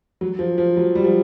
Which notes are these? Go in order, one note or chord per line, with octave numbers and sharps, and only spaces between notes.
F#3
F3
F3
F#3
G3
F3